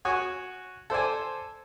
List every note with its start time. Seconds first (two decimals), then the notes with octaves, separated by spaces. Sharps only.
0.05 F#4 C#5 G#5
0.90 A4 C5 D5 G#5